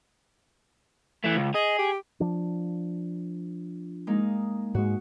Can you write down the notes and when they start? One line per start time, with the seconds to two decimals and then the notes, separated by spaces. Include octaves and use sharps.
1.24 E3 A3
1.36 C#2
1.55 G#4 D#5
1.79 G4
2.20 F3 D4
4.07 G#3 A#3 D#4
4.75 G#2 G#3 F#4